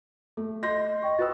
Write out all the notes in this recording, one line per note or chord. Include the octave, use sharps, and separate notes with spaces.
A3 A4
D#5 C6 G6 A#6
D#5 G5 C#6
F#4 B4 D#6 E6 F#6 A6